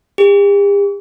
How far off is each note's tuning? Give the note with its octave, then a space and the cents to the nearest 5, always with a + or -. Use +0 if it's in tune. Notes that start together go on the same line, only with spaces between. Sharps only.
G4 +45